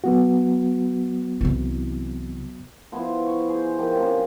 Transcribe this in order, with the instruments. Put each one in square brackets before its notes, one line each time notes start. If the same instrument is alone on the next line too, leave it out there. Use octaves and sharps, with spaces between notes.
[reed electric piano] F#3 B3 F#4
[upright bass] C2 E3
[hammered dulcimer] F3 B3 E4
C#6
G#4 C5
D#3 F3 G4
F3 A#3 C4 C#4